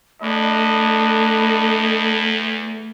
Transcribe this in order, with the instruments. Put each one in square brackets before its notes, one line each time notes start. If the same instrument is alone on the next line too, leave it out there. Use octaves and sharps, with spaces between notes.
[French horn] E2 [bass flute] A3 [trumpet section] D4 D#5 B5